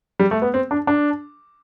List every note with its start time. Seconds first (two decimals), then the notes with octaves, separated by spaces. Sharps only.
0.19 G3
0.31 A3
0.42 B3
0.54 C4
0.71 D4
0.87 D4